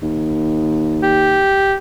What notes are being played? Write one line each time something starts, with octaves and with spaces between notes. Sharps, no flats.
D#2
G4